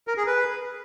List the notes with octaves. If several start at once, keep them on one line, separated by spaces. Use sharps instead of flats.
A#4
G#4
B4